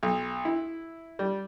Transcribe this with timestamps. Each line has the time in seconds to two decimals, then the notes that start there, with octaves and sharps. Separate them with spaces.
0.03 B1
0.45 E4
1.19 G3